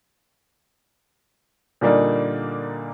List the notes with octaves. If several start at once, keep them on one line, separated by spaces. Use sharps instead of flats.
A#2 D3 G3 A#3 D#4